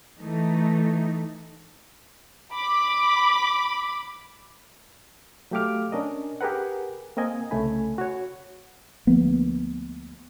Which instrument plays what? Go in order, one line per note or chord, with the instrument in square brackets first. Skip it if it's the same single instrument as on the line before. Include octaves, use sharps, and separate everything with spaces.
[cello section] E3 A3 D#4
[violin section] B5 D6
[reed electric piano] F#3 A3 G4 F5 D6 F6
C#4 D4 A#4 D#5
G4 G#4 A#4 B4 F#5
A#3 C4 A#4 D#5 G#5
C2 C#3 A3 C#4 G#5 B5
F#4 C#5
[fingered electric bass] D2 F3 A#3 B3